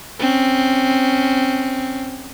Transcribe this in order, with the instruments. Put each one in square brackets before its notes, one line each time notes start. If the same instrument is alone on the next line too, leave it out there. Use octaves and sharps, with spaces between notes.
[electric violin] C4 C#4